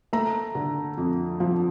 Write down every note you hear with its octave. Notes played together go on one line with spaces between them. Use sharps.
A3 A#5
D3
F2
F3